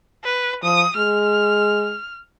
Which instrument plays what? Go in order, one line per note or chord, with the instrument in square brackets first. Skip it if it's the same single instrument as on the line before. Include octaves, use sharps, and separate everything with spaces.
[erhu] B4
[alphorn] F3 [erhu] D#6
[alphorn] G#3 [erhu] F6